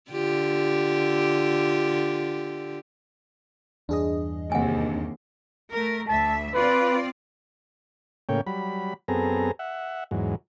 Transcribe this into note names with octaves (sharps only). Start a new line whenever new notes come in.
D3 F4 G4
E2 G2 D4 G#4 D#5
D#2 C3 F#5 G#5
A3 A#4
D2 E5 A5
C4 F4 B4 D5
A2 C#3 A#3 C#5 G5
F#3 G3 B5
F#2 B3 C4 G#4 A4 A#5
E5 F#5
E2 G#2 F#3